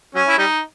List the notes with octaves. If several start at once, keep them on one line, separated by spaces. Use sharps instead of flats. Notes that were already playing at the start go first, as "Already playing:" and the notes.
F#3 C#4
E4
G3 D#4